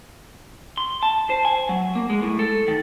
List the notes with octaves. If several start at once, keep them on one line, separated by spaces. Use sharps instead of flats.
C6
A5
C5
G#5
F#3
A#3
G#3
A2
A4
D#3